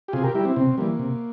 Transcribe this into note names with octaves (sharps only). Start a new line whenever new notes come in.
G4
C3 F4 G#4
G4 A#4
G3 E4 G4
C4 E4
C3 C4
E3 G3 A#3
C3